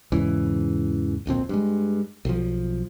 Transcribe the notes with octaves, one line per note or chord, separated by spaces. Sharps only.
E2 G#2 C#3 E3
D1 A#1 F2 C4
G2 G#3
B1 F3